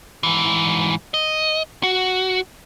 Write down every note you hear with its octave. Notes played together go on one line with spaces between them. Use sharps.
G#2 E3
D#5
F#4